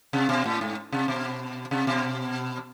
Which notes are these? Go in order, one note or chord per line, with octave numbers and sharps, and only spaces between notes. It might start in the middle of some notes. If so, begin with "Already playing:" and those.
C3
B2
A2
G#2
C3
B2
C3
B2